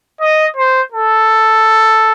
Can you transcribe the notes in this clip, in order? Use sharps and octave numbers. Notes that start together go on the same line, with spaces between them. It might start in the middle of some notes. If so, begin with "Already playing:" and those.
D#5
C5
A4